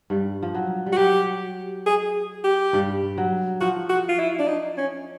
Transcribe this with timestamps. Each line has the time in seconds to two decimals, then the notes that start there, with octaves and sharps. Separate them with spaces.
0.10 G2 G3
0.43 F3
0.55 F#3
0.86 G3
0.92 F#4
0.98 F#3 G4
1.86 G#4
2.44 G4
2.73 G2 G3
3.18 F#3
3.61 F3 F#4
3.90 F#4
4.09 F4
4.19 E4
4.39 D4
4.48 D#4
4.78 C#4